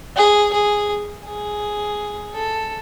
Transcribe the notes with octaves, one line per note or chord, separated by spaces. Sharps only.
G#4
G#4
G#4
A4